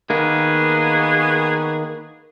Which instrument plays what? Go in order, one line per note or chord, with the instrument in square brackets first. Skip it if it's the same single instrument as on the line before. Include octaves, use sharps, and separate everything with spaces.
[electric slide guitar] D#3 A#3 [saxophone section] B3 F#4 G#4